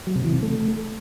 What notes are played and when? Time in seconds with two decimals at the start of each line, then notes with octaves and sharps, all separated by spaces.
0.07 F#3
0.16 C3
0.25 E3
0.34 C3
0.43 A3